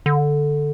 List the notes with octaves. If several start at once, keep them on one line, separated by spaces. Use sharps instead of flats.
D3